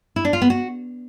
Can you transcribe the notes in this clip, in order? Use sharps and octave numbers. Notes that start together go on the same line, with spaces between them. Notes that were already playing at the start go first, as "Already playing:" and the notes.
E4
D4
F4
B3
F#4